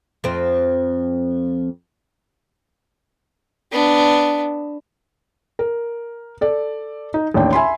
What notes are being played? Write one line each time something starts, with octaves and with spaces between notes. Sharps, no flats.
F2 C4
B3 D4
A#4
A4 D5
D#4
A1 D#2 D4 G5
E5 G#5 B5 C6